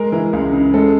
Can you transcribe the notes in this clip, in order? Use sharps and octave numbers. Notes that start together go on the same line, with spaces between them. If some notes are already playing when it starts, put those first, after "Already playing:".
Already playing: G#3 A#4
E3
C#2
C#3
G#3 A4